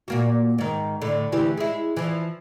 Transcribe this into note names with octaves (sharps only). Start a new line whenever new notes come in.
A#2 A#3 F#4
G#2 D#3
A2 D3
D2 E3 G4
G#3 E4
E3 F3